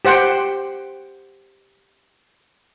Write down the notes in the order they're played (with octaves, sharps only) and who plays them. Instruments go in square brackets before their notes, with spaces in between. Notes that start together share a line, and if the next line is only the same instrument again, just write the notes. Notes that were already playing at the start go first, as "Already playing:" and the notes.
[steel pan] G4 C5 F#5 G5